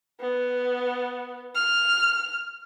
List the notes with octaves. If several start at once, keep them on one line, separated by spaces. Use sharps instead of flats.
B3
F6